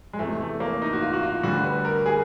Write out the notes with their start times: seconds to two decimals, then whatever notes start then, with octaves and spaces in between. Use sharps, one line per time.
0.13 G#3
0.19 E2 C3 E3 A3
0.41 A3
0.60 A#3
0.82 D#4
0.93 F#4
1.02 F4
1.13 F#4
1.23 F4
1.43 D2 D3 G3 F#4
1.64 B4
1.85 A#4
2.06 G#4